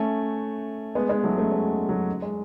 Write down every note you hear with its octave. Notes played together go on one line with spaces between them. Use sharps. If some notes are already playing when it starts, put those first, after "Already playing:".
Already playing: A3 C#4
G#3 B3
G#3 B3
F#3 A3
A3 C#4
G#3
F#3
G#3